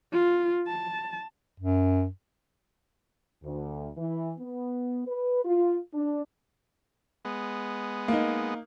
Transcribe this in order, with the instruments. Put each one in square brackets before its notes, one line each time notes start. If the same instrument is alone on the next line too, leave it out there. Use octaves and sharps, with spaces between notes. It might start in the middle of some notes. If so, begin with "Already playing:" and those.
[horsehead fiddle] F4
A5
[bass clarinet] F#2
[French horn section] D2
E3
B3
B4
F4
D4
[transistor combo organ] G#3 B3
[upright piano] A#3 D#4